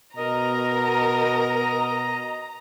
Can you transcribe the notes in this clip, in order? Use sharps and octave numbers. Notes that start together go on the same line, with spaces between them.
B2 A#4 D#5 A#5